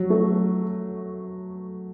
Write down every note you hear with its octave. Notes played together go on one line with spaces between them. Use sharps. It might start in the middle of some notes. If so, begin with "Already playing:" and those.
Already playing: F#3
A3